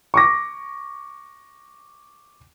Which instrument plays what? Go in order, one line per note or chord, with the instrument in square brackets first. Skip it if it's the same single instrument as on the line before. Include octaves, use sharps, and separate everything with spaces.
[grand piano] C#6 D6 A#6